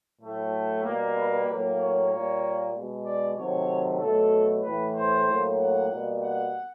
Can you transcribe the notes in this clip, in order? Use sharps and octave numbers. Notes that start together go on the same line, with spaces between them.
A2 F#3 A3
B2 G3 A#3
B4
A2 F#3 A#3
C#5
A#2 G3 A#3
B2 G#3
D5
C3 D#3 F#3 A3 C#5
B2 F#3 A3 A4
A2 E3 A3 B4
C5
A2 F#3 A#3
F#5
B2 G3 A#3
F#5